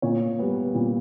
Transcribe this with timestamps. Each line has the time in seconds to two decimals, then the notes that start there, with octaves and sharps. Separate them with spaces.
0.02 A#2 C#5
0.39 G3 B3
0.75 A#2